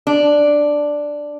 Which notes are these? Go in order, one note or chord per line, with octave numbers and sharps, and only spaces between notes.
D4